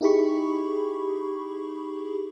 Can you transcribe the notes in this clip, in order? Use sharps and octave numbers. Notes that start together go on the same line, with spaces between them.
D#4 E4 G4 G#4 B5 C#6